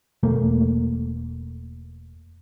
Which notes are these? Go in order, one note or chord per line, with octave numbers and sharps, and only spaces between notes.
E1 A3 A#3